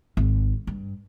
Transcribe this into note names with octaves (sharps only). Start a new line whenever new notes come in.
G#1
G2